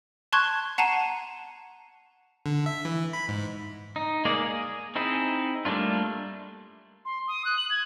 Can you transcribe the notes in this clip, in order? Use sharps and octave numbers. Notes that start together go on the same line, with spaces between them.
A5 C6 C#6 F#6 G#6
F#5 A5 A#5 C7 D#7
D3
E5
E3
B5
G#2
D#4
G#3 A#3 D#4 G#4 D5
G#4
C4 D#4 E4 G#4
G3 A3 A#3 D4 F4
C6
D#6
F#6
F#7
G#6